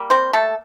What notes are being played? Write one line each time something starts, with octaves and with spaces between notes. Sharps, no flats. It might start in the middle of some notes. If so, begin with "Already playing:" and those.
Already playing: G3 A#3
C4 C5
A3 A4